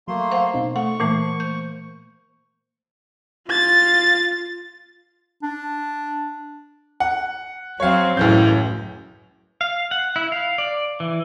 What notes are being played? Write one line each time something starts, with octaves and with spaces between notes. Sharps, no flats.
F#3 A3 A#3 C6
C5 F5 F#5
B2 C4 D#4
A3 F#5 C#6
A#2 E3 A3 A#3 C5
G6
F4 A6
D4
F#5
F#3 C4 C#5 F5
C#2 F#2 A2 E3 G6
F5
F#5
E4
F5
D5
E3